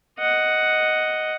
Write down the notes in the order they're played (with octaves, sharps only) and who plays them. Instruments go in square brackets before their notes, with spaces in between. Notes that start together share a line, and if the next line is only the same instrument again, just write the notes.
[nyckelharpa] D#5 F#5